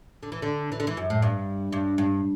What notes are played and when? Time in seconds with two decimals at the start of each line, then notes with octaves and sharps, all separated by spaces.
0.23 D3
0.32 E3
0.42 D3
0.72 E3
0.80 D3
0.87 E3
0.97 F#2
1.10 A2
1.22 G2
1.73 G2
1.98 G2